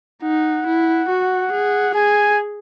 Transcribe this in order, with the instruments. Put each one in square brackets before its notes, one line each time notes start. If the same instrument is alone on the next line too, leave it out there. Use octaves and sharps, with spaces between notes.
[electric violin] D#4 [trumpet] F#5
[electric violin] E4
F#4
G#4
[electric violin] G#4 [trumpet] G#5